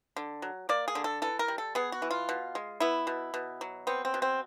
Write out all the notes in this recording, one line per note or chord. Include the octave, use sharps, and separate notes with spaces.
D3
F#3
A#3 D5
G#4
D3
A4
E3 A4
A#4
G3
A4
B3 G#4
F#4
E3
F4
B2
G#3
B3 E4
B2
B2
F#3
B3 C4
C4
B2
C4